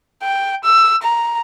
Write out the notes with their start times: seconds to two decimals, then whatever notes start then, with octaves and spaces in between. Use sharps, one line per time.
0.23 G5
0.64 E6
1.03 A#5